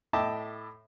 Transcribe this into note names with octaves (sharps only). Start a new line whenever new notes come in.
A2 D#5 E5 G5 A5 D6